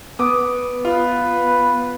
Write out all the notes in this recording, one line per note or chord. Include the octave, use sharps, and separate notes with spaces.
B3 D6 D#6
F4 B4